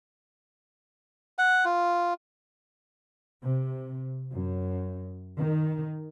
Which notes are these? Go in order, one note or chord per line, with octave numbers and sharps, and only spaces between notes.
F#5
F4
C3
F#2
D#3